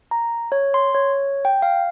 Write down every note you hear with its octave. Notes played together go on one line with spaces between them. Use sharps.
A#5
C#5
C6
C#5
G5
F5